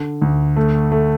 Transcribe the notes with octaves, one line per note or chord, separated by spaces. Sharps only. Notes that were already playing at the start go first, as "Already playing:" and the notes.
Already playing: D3
D2
A3
A3